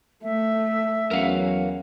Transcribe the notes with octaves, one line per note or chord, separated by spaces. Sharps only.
A3 E5
E2 F#3 C#4 A#4 F5 F#5